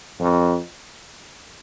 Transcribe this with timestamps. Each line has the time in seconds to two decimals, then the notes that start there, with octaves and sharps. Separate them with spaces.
0.20 F2